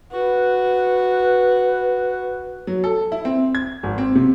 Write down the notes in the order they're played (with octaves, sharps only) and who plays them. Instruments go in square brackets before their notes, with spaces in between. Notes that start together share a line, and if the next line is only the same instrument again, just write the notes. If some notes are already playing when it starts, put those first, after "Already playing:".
[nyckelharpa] F#4 [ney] B4
[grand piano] F#3
A4
E4
C4
G#6
G#1
C4
C3